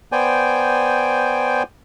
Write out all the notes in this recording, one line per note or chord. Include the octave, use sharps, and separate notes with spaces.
B3 C5 D5 G5 G#5